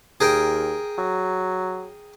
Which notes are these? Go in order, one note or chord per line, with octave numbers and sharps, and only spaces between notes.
D#2 G#4 A#4 G5
F#3